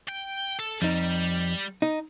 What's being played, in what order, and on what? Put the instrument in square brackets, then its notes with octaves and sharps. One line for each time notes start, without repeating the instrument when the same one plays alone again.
[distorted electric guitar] G5
A4
[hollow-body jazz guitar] F2 D#4 [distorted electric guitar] G3
[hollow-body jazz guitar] D#4